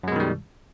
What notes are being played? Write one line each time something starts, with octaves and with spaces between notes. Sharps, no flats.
F#2 B2 D#3 G3 G#3